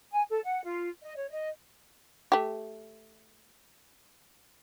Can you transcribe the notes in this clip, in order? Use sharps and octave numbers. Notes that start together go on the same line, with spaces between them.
G#5
A4
F#5
F4
D#5
C#5
D#5
A3 G4